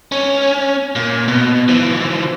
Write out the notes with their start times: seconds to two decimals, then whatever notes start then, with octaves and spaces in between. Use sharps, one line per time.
0.12 C#4
0.96 A#2
1.28 B2
1.68 E3 F3